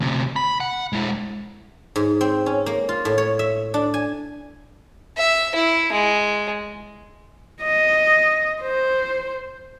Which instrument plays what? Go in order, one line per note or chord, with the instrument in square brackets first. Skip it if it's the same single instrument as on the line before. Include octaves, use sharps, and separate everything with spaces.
[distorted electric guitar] D2 C3
B5
F#5
G#3 E4
[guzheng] G#2
C4
C#4
A#3
F4
A2
C#5
E5
D4
G#5
[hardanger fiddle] E5
E4
G#3
[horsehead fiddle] D#5
C5